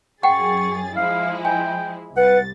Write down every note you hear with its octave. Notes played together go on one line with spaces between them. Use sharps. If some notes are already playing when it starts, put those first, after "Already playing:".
F#2 G#4 F#5 G5 C#6 A6
F3 G#3 E4 F5
G5 G#5
C2 B4 F#5 A6